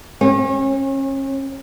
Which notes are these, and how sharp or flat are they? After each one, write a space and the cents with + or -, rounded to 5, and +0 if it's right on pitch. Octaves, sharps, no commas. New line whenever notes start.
C#4 -35